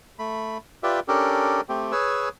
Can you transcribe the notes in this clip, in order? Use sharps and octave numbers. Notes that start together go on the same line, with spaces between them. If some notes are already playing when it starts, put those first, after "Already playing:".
A3 B5
F4 G4 B4 D5 E5
C#4 D4 G4 A4 A#4
A3 C4 G4
G#4 B4 C#5 G#5 E6